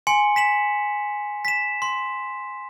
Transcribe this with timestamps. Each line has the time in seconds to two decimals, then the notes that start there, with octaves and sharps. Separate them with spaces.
0.07 G#5 C6 C#7
0.36 B6 E7 F#7
1.45 B6 E7
1.82 C6